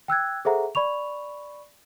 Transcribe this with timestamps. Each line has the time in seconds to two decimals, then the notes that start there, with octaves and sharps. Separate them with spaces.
0.08 G5 E6 F#6 G#6
0.45 G#4 A4 C5 E5 F#5 A#5
0.75 D5 B5 C#6 F7